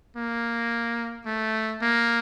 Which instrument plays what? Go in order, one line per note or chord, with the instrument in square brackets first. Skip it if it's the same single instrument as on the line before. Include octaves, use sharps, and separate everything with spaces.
[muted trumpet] A#3
A3
A#3